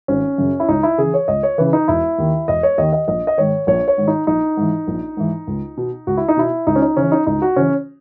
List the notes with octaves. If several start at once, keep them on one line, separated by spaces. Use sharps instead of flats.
G#1 C#4
F#2 C#3
E4
C#2 D#4
E4
C#3 E3 G#4
C#5
C#2 D#5
C#5
C#3 E3 B4
D#4
E1 E4
D#2 D#3
E1 D#5
C#5
D#2 D#3 D#5
D#5
A#1 D#5
D#5
G#2 D#3 C#5
A#1 C#5
C#5
G#2 D#3
D#4
A#1 D#4
G#2 E3
A#1
G#2 E3
C#2
B2
C#2 F#4
E4
D#4
B2 E4
C#2 D#4
C#4
D#4
C#3 E3 C#4
D#4
C#2 D#4
F#4
C#3 E3 C#4